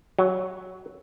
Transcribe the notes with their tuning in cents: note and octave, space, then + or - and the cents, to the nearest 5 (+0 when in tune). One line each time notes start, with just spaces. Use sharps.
F#3 +0